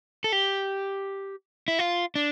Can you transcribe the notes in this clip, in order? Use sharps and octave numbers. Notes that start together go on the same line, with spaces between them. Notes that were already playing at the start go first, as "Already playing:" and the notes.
A4
G4
E4
F4
D4